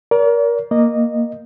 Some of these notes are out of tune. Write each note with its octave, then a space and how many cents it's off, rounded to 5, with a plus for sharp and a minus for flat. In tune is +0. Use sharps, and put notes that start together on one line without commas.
A#4 +20 D5 -45
A#3 +0 D#5 -15